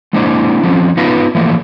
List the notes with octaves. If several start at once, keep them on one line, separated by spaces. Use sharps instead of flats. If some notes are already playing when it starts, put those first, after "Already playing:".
G#3 A#3 D4 E4 C5 D#5
F3 C4 C#4
B3 D#4 F4 B4 D#5 F5
E3 F3 A3 A#3